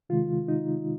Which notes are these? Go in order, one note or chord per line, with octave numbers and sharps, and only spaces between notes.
C3 D#3 G#3 F4
D#4